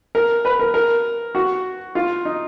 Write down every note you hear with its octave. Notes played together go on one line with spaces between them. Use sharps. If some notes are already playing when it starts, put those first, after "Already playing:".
A#4
B4
A#4
A#4
F#4
F4
D#4